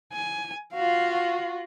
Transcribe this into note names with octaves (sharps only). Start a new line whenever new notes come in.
G#5
F4 F#4 F5